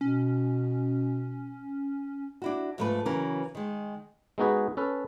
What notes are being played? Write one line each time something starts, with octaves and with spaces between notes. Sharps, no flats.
B2 C#4
D4 E4 F#4
G#2 F3 A3 A4 B4
C#3 E3 F#3 C#4 A#4
D#3 G#3
G#3 B3 D#4 F#4 G#4 B4
C#4 A4 B4